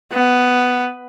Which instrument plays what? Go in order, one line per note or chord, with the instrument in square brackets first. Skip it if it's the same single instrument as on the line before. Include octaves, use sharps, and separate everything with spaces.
[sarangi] B3